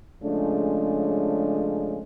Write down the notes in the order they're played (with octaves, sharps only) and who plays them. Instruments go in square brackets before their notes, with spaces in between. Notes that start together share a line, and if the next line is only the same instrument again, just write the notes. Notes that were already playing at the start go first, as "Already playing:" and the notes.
[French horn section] C#3 F3 G#3 A3 C#4 D4